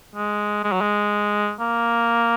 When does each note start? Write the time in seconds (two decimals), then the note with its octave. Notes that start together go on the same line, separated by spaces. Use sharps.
0.15 G#3
0.64 G#3
0.72 F#3
0.81 G#3
1.60 A#3